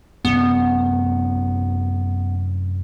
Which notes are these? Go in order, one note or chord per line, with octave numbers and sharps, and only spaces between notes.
F#2 C3 B3 C#4